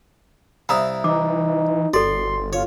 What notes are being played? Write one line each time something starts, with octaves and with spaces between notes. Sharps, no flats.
C2 E4 F5 A#5 D#6
E3 D#4 D6
G1 F#4 A4 D5 C6
F4 C#5